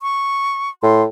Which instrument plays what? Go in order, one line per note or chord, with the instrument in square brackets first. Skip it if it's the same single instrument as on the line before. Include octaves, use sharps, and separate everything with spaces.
[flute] C#6
[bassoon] A2 [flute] C6